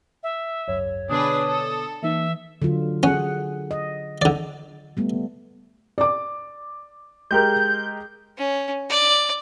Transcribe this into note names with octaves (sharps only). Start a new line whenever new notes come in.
E5
G#1 C#2 F#2 C#5
B2 D3 B3 D4 G#4 B4 D#6
A4
E3 A#3 D#4 E5
D3 F#3 F4
C#4 G#4 F#5
D#5
D3 D5
G3 A3 B3
D5 D6
G#3 G4 A#4 G6
C#4
D5